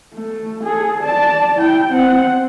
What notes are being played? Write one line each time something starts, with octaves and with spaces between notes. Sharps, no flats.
A3
G#4 A4
D5 A5
E4 G5
C4 F#5